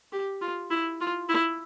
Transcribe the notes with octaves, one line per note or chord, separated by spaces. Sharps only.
G4
F4
E4
F4
E4